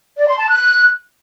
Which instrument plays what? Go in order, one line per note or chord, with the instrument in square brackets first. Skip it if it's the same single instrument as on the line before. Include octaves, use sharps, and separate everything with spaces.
[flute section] D5
C6
A5
F#6